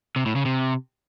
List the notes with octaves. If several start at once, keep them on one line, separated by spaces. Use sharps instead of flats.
C3
A2
C#3
C3